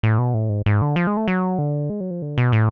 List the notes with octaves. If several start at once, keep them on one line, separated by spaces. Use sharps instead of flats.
A2
B2
A2
G#2
G#2
D3
F3
G#3
A3
F#3
D3
G#3
F#3
F3
D3
B2
A2